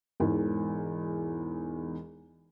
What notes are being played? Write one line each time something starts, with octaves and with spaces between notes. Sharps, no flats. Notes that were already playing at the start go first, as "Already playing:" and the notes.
E1 E2 G#2